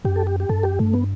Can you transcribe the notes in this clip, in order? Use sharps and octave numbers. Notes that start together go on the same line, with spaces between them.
F#2 G4
A4
G4
G4
F#2 A4
G2
F#2 G4
G2 A3
B3